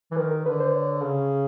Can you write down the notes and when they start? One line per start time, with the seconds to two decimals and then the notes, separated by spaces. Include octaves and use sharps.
0.12 E3
0.16 D#3 B4
0.31 A#4
0.46 D3 B4
0.60 C5
0.75 C#5
1.04 C#3